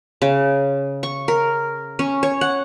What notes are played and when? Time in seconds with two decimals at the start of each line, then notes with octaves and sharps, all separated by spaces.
0.22 C#3
1.03 C#6
1.28 A#4
1.99 C#4
2.23 C#5
2.41 F#5